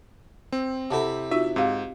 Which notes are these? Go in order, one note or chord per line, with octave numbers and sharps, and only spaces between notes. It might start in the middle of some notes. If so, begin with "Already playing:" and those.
C4
C3 E4 A4 F#5 A5
D#4 F4 F#4 E5
G#2 C4 G4 F5